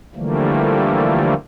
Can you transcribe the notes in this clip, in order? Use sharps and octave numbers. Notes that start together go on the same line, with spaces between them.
D3 E3 F3 G3 A3 A#3